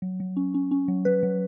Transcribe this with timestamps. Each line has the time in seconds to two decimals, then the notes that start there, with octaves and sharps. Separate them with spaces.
0.02 F#3
0.20 F#3
0.37 C#4
0.54 C#4
0.71 C#4
0.88 F#3
1.05 F#3 B4
1.23 F#3